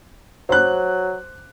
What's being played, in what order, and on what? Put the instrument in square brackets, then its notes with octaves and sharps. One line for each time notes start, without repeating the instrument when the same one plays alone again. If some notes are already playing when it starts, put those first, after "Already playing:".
[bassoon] F#3 [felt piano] C5 F#6